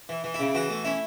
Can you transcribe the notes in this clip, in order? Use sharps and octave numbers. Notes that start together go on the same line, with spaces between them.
E3
E3
E4
C#3
E3 F#4
A3
C#4 E4